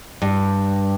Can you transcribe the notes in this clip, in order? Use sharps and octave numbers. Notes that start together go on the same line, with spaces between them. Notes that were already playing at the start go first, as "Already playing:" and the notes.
G2